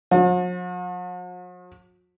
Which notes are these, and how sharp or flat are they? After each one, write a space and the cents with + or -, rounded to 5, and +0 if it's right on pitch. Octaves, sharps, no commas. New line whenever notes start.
F3 +45 F#4 -45